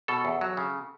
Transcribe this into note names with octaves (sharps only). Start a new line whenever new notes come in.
B2 A4
E2
F#3
C#3